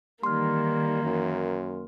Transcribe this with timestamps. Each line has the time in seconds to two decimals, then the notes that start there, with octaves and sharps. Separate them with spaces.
0.23 D#3 E3 G3 A#3 C6 F6
1.03 F#2